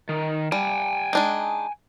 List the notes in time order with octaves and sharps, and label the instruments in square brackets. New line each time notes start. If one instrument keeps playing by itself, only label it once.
[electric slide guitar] D#3
[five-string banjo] G3 [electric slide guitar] G5 G#5
[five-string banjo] G#3 D4 D#4